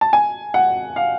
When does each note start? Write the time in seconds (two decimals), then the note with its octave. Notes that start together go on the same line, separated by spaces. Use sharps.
0.01 A5
0.13 G#5
0.54 F#5
0.96 F5